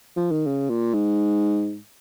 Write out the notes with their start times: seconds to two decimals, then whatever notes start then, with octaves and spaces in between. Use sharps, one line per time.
0.16 F3
0.31 D#3
0.47 C#3
0.69 A#2
0.94 G#2